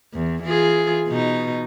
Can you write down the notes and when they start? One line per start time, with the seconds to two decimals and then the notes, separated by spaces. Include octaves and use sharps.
0.14 E2
0.43 E3 F4 G#4
1.08 B2 D#4